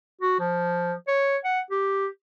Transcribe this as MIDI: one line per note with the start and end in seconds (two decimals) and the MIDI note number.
0.21 0.39 66
0.40 0.93 53
1.08 1.37 73
1.44 1.60 78
1.71 2.07 67